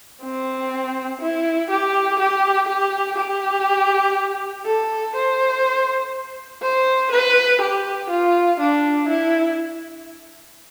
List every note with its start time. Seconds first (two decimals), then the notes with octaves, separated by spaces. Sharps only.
0.22 C4
1.21 E4
1.70 G4
2.19 G4
2.68 G4
3.18 G4
4.66 A4
5.15 C5
6.62 C5
7.11 B4
7.61 G4
8.10 F4
8.60 D4
9.09 E4